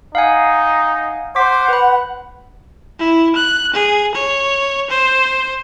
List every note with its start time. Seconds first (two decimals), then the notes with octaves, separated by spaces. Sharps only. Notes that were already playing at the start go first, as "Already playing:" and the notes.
0.15 D#4 F5 F#5 G#5
1.36 C5 F#5 D6 B6
1.68 B4 B5
2.99 E4
3.35 F#6
3.73 G#4
4.14 C#5
4.90 C5